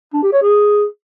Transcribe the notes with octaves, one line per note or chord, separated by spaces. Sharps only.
D4
G4
C#5
G#4